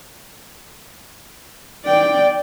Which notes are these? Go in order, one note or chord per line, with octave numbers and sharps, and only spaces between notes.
D5 G5